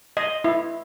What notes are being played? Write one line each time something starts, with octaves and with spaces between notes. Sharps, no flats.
D#5
E4